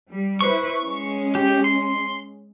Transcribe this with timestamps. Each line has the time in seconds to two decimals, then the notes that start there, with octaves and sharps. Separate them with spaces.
0.11 G3
0.41 E4 B4 C5 C#6
0.82 G#3 C#4
1.35 G4
1.64 C6